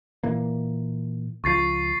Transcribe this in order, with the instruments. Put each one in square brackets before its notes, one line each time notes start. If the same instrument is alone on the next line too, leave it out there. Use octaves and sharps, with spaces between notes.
[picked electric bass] A#2 E3 A#3
[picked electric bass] C#2 F3 [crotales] C#6 A6 C7